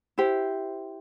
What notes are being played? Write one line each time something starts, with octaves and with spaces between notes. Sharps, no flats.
E4 G4 C5